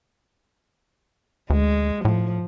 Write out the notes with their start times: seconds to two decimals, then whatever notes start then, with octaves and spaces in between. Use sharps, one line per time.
1.50 D2 G#3
2.05 A2 F3